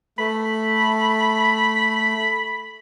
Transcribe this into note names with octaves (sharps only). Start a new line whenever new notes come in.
A3 B5